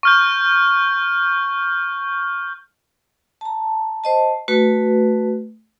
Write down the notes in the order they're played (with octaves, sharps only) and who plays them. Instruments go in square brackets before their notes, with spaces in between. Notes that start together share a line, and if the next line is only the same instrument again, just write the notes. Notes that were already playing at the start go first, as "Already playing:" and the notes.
[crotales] C#6 F6 G6
[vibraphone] A5 A#5
C5 D#5 A5
A3 F#4 B4